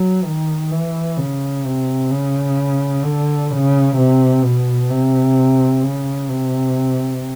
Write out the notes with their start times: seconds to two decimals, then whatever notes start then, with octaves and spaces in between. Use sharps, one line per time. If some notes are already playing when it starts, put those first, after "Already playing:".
Already playing: F#3
0.24 D#3
0.71 E3
1.17 C#3
1.64 C3
2.10 C#3
3.03 D3
3.50 C#3
3.96 C3
4.43 B2
4.89 C3
5.83 C#3
6.29 C3